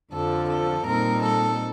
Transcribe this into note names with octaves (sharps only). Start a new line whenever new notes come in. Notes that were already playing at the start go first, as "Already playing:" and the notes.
F2 D3 F3 A4
A4
A#2 G3 C4 D#4 A#4
A4